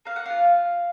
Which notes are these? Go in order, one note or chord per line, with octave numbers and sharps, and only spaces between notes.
A#3 F5
F#5
F4 F5